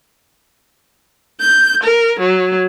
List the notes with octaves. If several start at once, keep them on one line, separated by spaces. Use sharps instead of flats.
G6
A#4
F#3